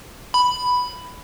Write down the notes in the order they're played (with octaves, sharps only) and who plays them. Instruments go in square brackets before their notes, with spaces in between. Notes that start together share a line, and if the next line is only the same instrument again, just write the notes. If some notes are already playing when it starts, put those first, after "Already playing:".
[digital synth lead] B5